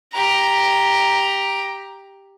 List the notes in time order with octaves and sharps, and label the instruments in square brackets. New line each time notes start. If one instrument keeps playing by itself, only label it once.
[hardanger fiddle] G4 A#5